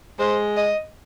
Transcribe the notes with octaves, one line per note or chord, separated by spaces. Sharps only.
G#3 C5
D#5